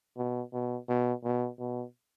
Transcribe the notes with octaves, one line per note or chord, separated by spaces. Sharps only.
B2
B2
B2
B2
B2